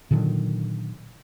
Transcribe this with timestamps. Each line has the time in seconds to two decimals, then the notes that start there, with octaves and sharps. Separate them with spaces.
0.11 A#2 D3 D#3 F#3